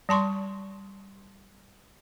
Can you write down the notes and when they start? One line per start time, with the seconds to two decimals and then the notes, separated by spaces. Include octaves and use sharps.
0.09 G3 A5 C6 C#6